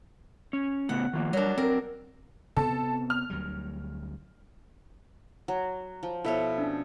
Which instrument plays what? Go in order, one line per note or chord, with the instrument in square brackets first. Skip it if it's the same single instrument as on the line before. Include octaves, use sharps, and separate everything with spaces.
[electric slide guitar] C#4
[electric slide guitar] A2 C#3 B3 [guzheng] F#5
[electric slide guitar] D#3 F3 A#3
[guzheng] F#3 D4 [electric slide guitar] G3 A#4
[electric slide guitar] C4 [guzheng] A#4
[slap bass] C3 B3 C4 [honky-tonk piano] A4
[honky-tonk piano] F6
[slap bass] D2 F#3 G3
[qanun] F#3
F3
[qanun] B2 F3 C#5 [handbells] E4 A4 E5
[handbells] C#4 D4